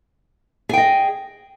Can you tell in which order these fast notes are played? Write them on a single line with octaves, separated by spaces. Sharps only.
G#4 G5 D#5